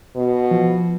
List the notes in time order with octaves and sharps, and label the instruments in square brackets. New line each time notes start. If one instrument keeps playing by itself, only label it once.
[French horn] B2
[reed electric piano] F3